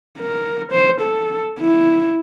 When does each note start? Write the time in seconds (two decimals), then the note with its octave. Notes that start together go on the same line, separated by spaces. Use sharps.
0.19 A#4
0.72 C5
1.01 A4
1.60 E4